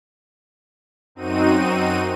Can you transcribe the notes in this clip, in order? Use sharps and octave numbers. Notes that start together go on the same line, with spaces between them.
F#2 C4 D#4 F#4 D#7